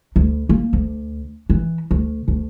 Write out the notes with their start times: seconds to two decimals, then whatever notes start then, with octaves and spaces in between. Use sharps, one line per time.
0.16 D2
0.49 A#3
0.73 D2
1.50 E3
1.91 D2
2.28 D2